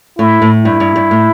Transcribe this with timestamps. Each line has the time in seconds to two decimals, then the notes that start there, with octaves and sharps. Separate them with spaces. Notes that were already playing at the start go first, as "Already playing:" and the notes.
0.19 A2 E4
0.42 A2
0.65 G2 E4
0.80 G2
0.96 G2
1.11 A2